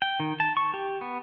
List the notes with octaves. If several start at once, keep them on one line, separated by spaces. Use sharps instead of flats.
G5
D#3
A5
C#6
G4
B3